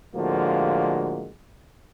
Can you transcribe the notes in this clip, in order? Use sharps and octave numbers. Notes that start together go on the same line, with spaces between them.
A2 D3 F3 G#3 A#3 F#4